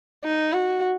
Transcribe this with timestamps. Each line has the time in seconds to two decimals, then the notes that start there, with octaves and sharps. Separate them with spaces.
0.24 D#4
0.53 F#4